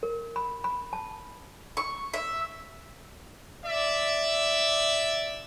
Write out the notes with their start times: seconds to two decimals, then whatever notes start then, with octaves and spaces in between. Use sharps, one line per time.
0.03 A#4
0.36 B5
0.64 B5
0.93 A5
1.77 C#6
2.14 E5
3.65 D5 E5